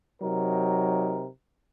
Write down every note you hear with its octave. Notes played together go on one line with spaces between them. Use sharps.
C3 F#3 D#4 A#4